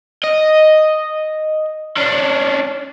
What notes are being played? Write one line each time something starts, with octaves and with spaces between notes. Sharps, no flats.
D#5
C#4 D4